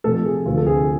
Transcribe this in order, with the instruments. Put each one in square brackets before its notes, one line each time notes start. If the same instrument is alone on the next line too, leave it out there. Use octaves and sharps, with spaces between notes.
[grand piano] C3 F3 A3 A4
G#4
D2 C3 F3 F4
A4
G#4